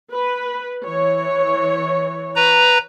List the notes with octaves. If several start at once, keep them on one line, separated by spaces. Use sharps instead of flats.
B4
E3 C#5
B4 A#5